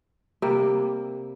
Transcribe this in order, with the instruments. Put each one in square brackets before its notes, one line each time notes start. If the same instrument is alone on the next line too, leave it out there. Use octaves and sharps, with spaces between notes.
[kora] C3 G3 A#3